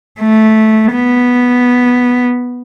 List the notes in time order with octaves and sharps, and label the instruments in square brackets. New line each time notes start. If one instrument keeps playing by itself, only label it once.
[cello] A3
B3